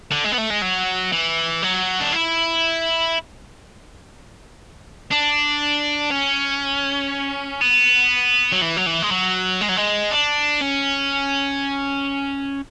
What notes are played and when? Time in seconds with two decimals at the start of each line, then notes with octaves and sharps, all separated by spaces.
0.12 D3
0.24 G#3
0.32 B3
0.38 A3
0.50 G#3
0.62 F#3
1.12 E3
1.62 F#3
2.00 D4
2.12 E4
5.12 D4
6.11 C#4
7.61 B3
8.52 F#3
8.62 E3
8.76 F#3
8.86 E3
9.02 G#3
9.11 F#3
9.61 G#3
9.69 F#3
9.77 G#3
10.11 D4
10.62 C#4